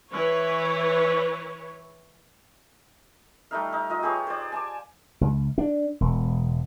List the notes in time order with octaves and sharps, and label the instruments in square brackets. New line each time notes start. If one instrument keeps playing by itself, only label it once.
[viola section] E3 B4 C#5
[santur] G3 A3 D#4 F5
D#4
F4 D#5
G4 G#4 B4 C#5
C5 D5
G#5 A5 D6
[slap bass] C#2
D4
E1